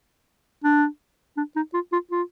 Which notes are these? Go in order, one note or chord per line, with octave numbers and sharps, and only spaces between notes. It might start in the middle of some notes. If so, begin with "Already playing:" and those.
D4
D4
D#4
F4
F4
F4